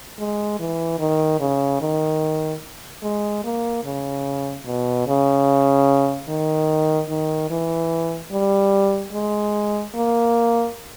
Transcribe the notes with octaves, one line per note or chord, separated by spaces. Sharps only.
G#3
E3
D#3
C#3
D#3
G#3
A#3
C#3
B2
C#3
D#3
D#3
E3
G3
G#3
A#3